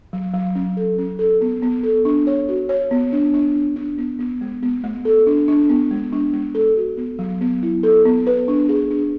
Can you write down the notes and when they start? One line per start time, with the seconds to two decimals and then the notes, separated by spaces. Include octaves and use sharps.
0.13 F#3
0.34 F#3
0.55 C#4
0.77 A4
0.98 C#4
1.19 A4
1.41 B3
1.62 B3
1.83 A4
2.05 D4
2.27 C#5
2.49 F#4
2.69 C#5
2.91 B3
3.13 D4
3.34 D4
3.55 D4
3.76 D4
3.98 B3
4.19 B3
4.41 G#3
4.63 B3
4.84 A3
5.05 A4
5.27 D4
5.48 D4
5.69 B3
5.91 G#3
6.13 D4
6.33 G#3
6.55 A4
6.77 F#4
6.97 B3
7.19 F#3
7.41 B3
7.63 E4
7.83 A4
8.05 B3
8.27 B4
8.48 D4
8.69 G#4
8.91 D4